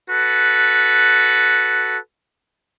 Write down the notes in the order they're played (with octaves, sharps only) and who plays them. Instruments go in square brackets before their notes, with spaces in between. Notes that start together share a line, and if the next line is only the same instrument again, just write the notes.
[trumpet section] F#4 A4 B4